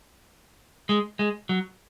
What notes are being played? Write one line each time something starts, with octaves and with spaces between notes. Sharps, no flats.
G#3
G#3
F#3